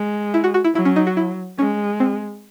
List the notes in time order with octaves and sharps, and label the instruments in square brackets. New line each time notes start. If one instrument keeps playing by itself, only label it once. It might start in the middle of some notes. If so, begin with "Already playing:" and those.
Already playing: [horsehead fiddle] G#3
[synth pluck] E4
F#4
F#4
E4
[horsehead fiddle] F#3 [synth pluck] E4
[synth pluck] C#4
D#4
F#4
E4
[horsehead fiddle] G#3 [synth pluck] C#4
[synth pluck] C4